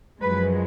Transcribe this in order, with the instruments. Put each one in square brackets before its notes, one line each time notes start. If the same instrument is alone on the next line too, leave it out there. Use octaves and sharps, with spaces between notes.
[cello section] F#2 F3 G#3 B4